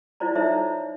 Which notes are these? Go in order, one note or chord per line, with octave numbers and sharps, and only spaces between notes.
E4 F4 C5 D5 A#5
D#4 A4 C5 C#5 E5 A#5